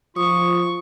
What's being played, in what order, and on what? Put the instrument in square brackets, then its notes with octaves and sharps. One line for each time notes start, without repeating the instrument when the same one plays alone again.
[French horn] F3 [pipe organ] F4 [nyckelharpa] C#6 [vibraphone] D#6